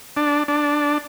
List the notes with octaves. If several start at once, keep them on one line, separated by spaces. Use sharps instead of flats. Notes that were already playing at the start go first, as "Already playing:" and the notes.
D4
D4